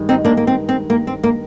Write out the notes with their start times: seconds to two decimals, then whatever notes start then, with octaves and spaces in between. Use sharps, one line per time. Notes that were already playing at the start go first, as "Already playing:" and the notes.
Already playing: G2 D#3 G#3
0.09 C4 D#4
0.25 A#3 D4
0.37 A#3
0.47 C4
0.69 C4
0.90 A#3
1.07 C4
1.24 A#3